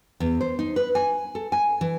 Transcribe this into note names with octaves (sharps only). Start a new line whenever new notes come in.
E2
C5
D#4
B4
G#5
A4
G#5
E3